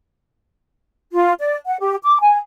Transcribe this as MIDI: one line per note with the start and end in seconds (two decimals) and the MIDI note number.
1.12 1.31 65
1.39 1.56 74
1.66 1.76 78
1.79 1.95 67
2.03 2.17 86
2.21 2.39 80